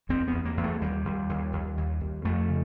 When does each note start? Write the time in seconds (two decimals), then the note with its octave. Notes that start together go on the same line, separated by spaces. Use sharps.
0.09 E2 C4
0.28 B3
0.33 E2
0.45 A#3
0.57 E2
0.64 A3
0.81 D#2 G3
1.05 D#2
1.29 D#2
1.53 D#2
1.77 D#2
2.01 D#2
2.25 F2 A3
2.49 C#3